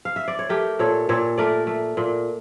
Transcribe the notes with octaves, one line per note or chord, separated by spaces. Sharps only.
F5
E5
D5
C#5
A3 G4 A#4
A#2 A4 C#5
A#2 A4 C#5
A3 A#4 D5
A3
A#2